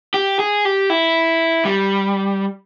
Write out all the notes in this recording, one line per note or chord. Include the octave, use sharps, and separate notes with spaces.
G4
G#4
G4
E4
G3